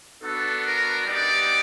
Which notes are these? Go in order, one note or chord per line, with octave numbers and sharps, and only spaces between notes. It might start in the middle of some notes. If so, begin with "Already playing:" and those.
B3 D4 F#4 A4
A#4
G3 B3 D#4 G4 D5